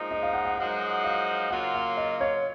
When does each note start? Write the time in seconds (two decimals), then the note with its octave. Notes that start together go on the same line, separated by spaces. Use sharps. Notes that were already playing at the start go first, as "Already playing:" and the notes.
Already playing: A#2 F3 G#3 D#4
0.11 D#5
0.23 F5
0.33 F#5
0.45 F#5
0.57 F#2 F3 G#3 D#4 F#4 F#5
1.04 F5
1.50 C#3 F#3 A#3 F4 F#5
1.75 F5
1.97 D#5
2.21 C#5